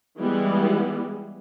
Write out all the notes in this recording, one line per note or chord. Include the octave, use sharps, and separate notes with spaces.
E3 G3 G#3 B3